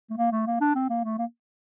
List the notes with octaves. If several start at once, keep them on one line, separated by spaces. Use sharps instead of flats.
A3
A#3
A3
A#3
D4
C4
A#3
A3
A#3